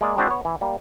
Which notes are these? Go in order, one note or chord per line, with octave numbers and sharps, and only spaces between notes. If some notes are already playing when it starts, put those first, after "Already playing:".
G#3 A#3 D5
G#3 C4 D4 E4 F#4 C5
B3 C#5
E3
G3 A#3